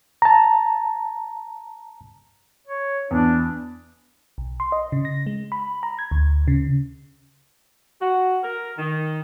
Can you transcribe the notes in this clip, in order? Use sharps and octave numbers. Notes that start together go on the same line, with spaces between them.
A5 A#5
C#5
E2 D4
B1
C6
D#5
C#3
A#6
G#3
B5
A#5
G#6
D2
C#3
F#4
A#4
D#3